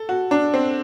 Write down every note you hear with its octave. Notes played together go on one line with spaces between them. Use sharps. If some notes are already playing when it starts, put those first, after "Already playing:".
Already playing: A4
F#4
D4
C4